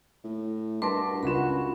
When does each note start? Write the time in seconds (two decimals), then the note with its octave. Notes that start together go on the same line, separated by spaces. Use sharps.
0.25 A2
0.82 G2 F#4 A#4 B4 A5 C6 D6
1.23 C#2 F4 F#4 B5 E7